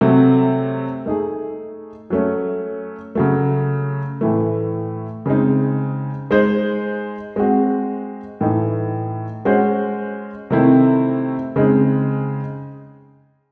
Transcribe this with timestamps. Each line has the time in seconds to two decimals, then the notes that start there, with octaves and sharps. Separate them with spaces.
0.01 C3 F#3 A3
1.06 A3 D#4 G#4
2.10 F#3 A3 C#4
3.15 C#3 F#3 A3
4.21 A2 E3 A3
5.26 C#3 G#3 C4 D#4
6.31 G#3 D#4 G#4 C5
7.36 G#3 C4 F#4
8.41 A2 E3 A3 D#4
9.45 G#3 C#4 F#4 C5
10.50 C3 D#3 A3 C4 E4
11.56 C#3 G#3 C4 D#4